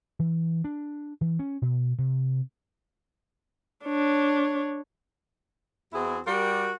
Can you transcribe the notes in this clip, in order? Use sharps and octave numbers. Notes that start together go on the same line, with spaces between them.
E3
D4
E3
C#4
B2
C3
D4 C#5
E2 C4 E4 F#4 G#4
G3 F#4 G4 A#4